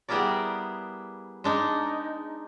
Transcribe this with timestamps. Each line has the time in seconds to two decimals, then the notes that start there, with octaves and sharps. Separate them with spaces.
0.08 G3 B3 E4 G#4 A#4 D5
1.44 G#3 D4 D#4